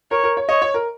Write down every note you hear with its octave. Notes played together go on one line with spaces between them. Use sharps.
A#4 C#5
A#4
C#5
C#5 D#5
C#5
A#4